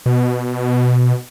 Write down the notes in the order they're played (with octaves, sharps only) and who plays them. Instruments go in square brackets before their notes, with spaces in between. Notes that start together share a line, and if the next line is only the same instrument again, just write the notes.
[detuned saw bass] B2